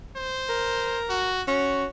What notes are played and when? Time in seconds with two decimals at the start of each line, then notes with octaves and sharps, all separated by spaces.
0.17 C5
0.49 A#4
1.10 F#4
1.47 C#4 F#4